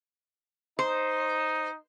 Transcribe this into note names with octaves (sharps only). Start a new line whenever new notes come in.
D#4 C5